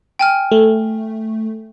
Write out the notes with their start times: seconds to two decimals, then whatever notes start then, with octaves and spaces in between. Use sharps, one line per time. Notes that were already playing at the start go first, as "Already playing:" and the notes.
0.19 G5 G#5 F6
0.52 A3